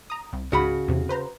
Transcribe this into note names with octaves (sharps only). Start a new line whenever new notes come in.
A#5 D#6
C2
C#2 G#2 C#3 F#4 B5
E2 C3
B4 C5 A#5